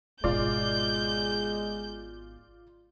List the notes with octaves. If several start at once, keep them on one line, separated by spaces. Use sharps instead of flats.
G#1 B2 G#3 F4 D5 G6